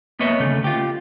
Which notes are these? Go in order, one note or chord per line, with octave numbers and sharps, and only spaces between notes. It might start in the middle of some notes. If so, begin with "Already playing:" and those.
A#3 B3 B4 C#5 D#5 E5
D2 C#3 A3
F4 G4